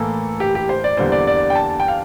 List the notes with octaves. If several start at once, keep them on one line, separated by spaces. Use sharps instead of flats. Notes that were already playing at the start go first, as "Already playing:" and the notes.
Already playing: A2 E3 A#3 A4
G4
G4
C5
D5
E2 D3 G3 A#3 C5
D5
D5
G5
A5
A5
G5
F5